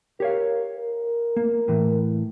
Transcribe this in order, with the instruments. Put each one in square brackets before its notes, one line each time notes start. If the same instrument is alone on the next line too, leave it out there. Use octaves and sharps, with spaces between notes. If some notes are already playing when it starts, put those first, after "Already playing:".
[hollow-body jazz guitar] G4 C#5 F5 [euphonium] A#4
[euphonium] A#4
[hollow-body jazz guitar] A#3
A2 E3